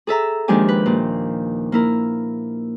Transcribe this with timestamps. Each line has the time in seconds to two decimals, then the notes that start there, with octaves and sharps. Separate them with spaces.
0.07 G#4 A4 E5 A#5
0.48 D#2 F3 G#3 D4 G4 G#5
0.68 B4
0.86 A#2
1.72 A#3 E4 A#4